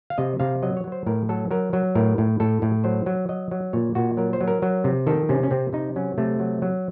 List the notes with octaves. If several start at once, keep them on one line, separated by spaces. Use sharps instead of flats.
F5
C3 D#5
C3 F5
F#3 D#5
C#5
F#3
C5
A2 A#4
F#3 A4
F#3 A#4
F#3
A2 A#4
A2
A2 A4
A2
F#3 C5
F#3
F#3 D#5
F#3
A#2 C#5
A#2 F#4
F#3 A#4
C5
F#3
A#4
F#3
C3
D#3 A4
C3 C#4
C#4
C3 C4
C3 D#4
F#3 C#4
C3 A3
F#3
F#3